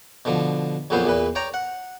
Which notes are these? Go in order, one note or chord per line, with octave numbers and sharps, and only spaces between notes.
B2 D3 F3
A#1 F2 A#2 F#3 B3 C5
E2 A#2 B4
C#5 D5 G5 A#5
F#5